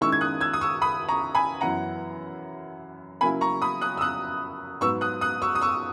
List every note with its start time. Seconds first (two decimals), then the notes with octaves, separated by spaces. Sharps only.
0.01 D#3 G#3 C#4 E4 C#6 E6
0.12 G#6
0.21 D#6 F#6
0.41 E6 G#6
0.54 D#6
0.61 C#6 E6
0.82 B5 D#6
1.09 A#5 C#6
1.35 G#5 B5
1.61 F#2 E3 B3 E4 F#5 A#5
3.21 C#3 F#3 A#3 E4 G#5 B5
3.41 A#5 C#6
3.62 B5 D#6
3.81 D#6 F#6
3.97 E6
4.01 D#6 F#6
4.81 G#2 F#3 B3 C#6 E6
5.01 D#6 F#6
5.21 D#6 F#6
5.42 C#6 E6
5.55 D#6
5.61 C#6 E6